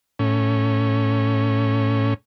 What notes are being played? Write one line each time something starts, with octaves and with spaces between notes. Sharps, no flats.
A2 C#4